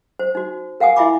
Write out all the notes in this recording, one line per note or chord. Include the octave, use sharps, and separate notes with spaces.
C5
D#4 F#4
A#4 F5 F#5 G#5 D#6
E4 F4 E5 G#5 B5 D6